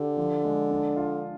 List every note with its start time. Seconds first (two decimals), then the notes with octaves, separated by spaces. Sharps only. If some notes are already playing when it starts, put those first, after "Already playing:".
Already playing: D3 G4
0.17 F3
0.44 G#3
0.71 D4
0.96 F4